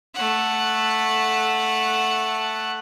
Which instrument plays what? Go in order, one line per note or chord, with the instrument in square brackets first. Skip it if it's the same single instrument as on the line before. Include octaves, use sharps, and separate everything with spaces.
[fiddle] A3 F#5